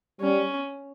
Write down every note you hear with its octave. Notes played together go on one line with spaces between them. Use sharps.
G3 C#4